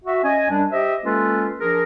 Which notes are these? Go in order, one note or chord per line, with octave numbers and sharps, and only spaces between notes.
F#4 E5
C#4 D#5 G#5
F#2 G3 D4
G4 C5 D#5 E5
G#3 A#3 C#4 F4 A4 B4
F3 D4 G#4 A#4